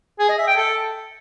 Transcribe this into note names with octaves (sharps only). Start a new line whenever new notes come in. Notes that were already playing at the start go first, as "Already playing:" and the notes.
G#4
D#5
E5
G5
A4